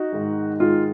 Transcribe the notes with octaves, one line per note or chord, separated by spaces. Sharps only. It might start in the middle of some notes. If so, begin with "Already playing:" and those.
Already playing: D#4 F#4
G#2 D#3 G#3
G#2 D#3 G#3 F4